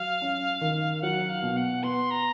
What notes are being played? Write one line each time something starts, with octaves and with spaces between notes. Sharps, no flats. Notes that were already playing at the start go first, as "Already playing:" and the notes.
Already playing: F#3 F5
C#4
D#3
F#3 F#5
F5
B2
F#5
B3 C6
A#5